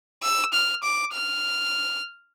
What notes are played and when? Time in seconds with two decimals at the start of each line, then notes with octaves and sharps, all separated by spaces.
0.23 E6
0.53 F6
0.83 D6
1.14 F6